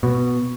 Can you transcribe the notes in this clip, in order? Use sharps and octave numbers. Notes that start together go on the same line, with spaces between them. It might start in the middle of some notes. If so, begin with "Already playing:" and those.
B2